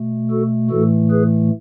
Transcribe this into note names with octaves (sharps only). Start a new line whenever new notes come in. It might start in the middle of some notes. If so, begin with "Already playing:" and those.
Already playing: B2 A3
F#4 A4
A2 E3 A3 F#4 A4
G#4 B4